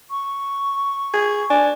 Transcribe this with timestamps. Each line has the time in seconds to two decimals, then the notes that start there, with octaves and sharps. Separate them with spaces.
0.10 C#6
1.13 G#4
1.50 D4 G#5